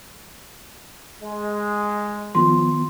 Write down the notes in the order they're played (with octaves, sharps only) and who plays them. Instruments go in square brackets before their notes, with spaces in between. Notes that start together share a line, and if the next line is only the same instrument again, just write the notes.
[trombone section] G#3
[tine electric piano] D#3 B3 F4 [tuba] F3 [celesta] C6